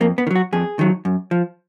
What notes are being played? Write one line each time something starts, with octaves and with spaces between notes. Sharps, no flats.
F2 A#3
B3
D#3
F#3 F#4
F2 G#4
D#3 F#3
F#2
F3